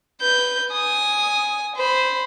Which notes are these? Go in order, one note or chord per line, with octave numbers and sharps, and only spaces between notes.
B4 G6
G#5 D#6
C5 B5